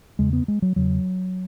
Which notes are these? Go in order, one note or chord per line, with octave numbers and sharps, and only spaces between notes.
E2 C#3 G#3
B3
G#3
F#3
E2 C#3 F#3